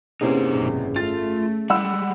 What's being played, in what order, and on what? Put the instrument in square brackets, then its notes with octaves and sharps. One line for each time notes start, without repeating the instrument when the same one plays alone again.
[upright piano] E2 C3 A#3 [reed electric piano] C#4 G#4 [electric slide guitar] D#4 C5
[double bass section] G#1 F#2 B2
[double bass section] A3 [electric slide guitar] F4 [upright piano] A6
[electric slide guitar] G3 G#3 [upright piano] F#5 B5 E6